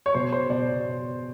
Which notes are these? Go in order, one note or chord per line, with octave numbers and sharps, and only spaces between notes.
C#5
B2 C5
C5
B2 D5